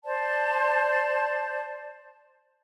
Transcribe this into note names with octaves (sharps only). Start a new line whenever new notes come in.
C5 D5 A5